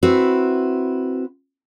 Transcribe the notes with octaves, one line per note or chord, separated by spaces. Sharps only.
C4 E4 F#4 B4